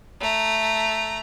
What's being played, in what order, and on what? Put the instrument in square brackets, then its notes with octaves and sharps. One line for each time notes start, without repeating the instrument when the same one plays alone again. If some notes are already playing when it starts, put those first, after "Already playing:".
[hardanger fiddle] A3 A#5